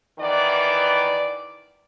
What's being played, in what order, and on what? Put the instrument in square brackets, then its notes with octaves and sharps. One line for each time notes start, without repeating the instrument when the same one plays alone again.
[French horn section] E2 D#3 E3 D5